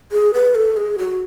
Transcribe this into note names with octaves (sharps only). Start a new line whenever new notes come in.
G#4
B4
A4
G#4
F#4